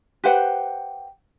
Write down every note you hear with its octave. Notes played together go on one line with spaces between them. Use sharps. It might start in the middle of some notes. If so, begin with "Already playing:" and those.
G4 B4 C5 F#5